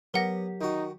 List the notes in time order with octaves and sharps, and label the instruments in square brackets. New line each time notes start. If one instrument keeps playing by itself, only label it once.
[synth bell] F#3 G4 [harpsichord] B3 [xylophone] A#4 F#5 A#6
[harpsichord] D#3 F#4 [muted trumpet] D#4